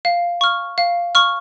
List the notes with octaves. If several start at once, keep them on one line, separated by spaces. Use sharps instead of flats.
F5
C#6 F6
F5
C#6 F6